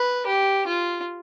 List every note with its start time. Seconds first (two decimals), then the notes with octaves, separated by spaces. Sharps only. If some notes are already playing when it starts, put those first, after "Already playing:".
Already playing: B4
0.26 G4
0.67 F4